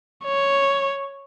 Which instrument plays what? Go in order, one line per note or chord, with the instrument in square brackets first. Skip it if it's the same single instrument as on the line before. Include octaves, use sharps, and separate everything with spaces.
[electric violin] C#5